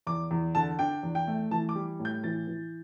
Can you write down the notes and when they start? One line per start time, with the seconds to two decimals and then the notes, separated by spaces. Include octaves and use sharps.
0.07 E2 D6
0.31 E2
0.55 D3 A5
0.79 D4 G5
1.03 E2
1.15 G5
1.27 A3
1.51 E3 A5
1.69 D6
1.75 G3
1.99 A2
2.05 G6
2.24 E3 A6
2.48 E3